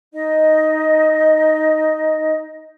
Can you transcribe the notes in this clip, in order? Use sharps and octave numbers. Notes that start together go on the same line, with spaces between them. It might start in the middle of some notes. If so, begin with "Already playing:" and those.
D#4 D#5